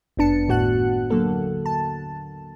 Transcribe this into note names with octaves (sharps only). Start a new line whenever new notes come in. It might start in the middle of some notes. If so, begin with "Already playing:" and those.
G1 F#2 B3 D4 A5 C#7
D#2 A2 F#4 F#5 F#6
D3 F#3 A#3 A4
A5